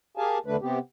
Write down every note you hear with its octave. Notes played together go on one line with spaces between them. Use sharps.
G4 G#4 A#4 F5 G#5 A5
E2 D3 A3 D4 B4
C3 B3 C4 G4